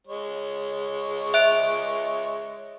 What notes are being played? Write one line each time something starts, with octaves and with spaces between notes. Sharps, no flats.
G#3 C#5
E5 F#6 D7